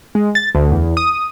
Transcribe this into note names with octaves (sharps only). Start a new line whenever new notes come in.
G#3
A6
D2
E2
D#6